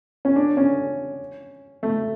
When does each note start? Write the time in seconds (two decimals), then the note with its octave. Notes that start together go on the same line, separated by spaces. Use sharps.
0.25 C#4
0.36 D4
0.57 C#4
1.83 A3